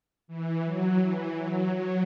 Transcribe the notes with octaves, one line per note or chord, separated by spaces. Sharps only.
E3
F#3
E3
F#3
F#3